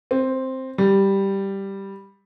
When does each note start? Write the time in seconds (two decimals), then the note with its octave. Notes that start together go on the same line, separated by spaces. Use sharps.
0.11 C4
0.78 G3